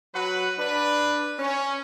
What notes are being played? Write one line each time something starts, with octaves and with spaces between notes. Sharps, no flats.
F#3 F#4 B4
D4 B4
C#4